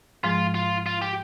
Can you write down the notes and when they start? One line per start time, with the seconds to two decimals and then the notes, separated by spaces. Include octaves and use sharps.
0.24 G#2 F3 G#3 F4
0.55 F4
0.86 F4
1.02 G4